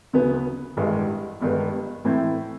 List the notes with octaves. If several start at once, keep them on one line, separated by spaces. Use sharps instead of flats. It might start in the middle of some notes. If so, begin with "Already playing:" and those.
D2 C#3 F#3 B3
A1 G2 D#3 G#3
G1 G2 D#3 G#3 B3
A2 E3 A3 C4 E4